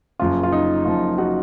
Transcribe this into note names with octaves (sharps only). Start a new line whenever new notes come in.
F#1 F#2 F3 F4
F4
D#4
F#1 F#2 F3 F4
D#4 F#4